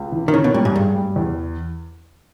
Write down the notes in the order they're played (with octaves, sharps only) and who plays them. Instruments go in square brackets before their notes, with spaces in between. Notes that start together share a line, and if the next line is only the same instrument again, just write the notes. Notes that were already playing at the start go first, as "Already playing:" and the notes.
Already playing: [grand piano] C#2
E3
[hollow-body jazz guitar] D#3
[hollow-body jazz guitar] C#3 [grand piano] C#4
[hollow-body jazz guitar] B2
[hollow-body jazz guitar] A#2 [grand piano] G3
[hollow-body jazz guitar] G#2
[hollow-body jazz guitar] G2 [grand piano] G#4
[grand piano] G3
E2